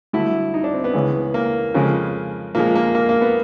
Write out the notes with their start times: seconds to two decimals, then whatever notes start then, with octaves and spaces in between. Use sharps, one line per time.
0.13 G2 D3 F#3 A3 E4
0.54 D#4
0.64 D4
0.74 C4
0.84 B3
0.94 C#2 C#3 E3 G#3
1.34 A#3
1.74 F2 C#3 F3 G#3
2.55 A#2 F3 G#3 A#3
2.75 A#3
2.95 A#3
3.09 A#3
3.22 B3